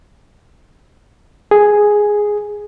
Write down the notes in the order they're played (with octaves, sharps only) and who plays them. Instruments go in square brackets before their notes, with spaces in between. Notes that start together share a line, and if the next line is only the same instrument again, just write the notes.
[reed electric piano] G#4